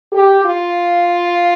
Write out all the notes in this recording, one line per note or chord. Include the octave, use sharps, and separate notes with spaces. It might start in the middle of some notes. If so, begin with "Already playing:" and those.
G4
F4